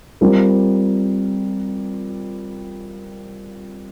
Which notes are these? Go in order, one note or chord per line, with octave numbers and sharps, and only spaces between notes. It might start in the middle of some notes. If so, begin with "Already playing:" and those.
G3 C4 F4 A#4